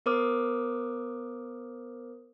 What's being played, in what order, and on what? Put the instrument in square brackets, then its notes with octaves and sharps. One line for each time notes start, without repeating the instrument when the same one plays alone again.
[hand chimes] B3 A#4 C5 D6 D#6 F6